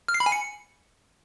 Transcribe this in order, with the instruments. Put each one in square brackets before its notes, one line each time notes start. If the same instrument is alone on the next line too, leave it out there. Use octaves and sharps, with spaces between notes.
[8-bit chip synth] F6
C7
B5
G#5
C#7